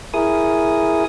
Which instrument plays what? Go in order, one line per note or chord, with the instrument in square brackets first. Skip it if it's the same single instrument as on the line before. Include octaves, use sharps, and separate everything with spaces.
[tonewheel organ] E4 G#4 A#4 G#5 D#6